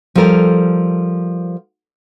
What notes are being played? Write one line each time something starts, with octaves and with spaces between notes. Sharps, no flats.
F3 G3 A4 A#4